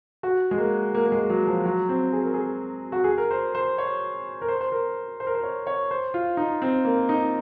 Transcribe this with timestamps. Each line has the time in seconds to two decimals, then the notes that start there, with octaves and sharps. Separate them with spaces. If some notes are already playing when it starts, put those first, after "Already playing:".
0.23 F#4
0.51 G#3
0.58 A#3
0.95 A#3
1.06 A#3
1.12 G#3
1.30 F#3
1.47 F3
1.65 F#3
1.89 C4
2.13 G#4
2.23 A#4
2.34 G#4
2.92 F#4
3.04 G#4
3.18 A#4
3.31 C5
3.55 C5
3.78 C#5
4.42 A#4
4.48 C5
4.61 C5
4.72 A#4
5.20 C5
5.27 A#4
5.34 C5
5.43 C#5
5.67 C#5
5.91 C5
6.14 F4
6.37 D#4
6.62 C4
6.85 A#3
7.09 D#4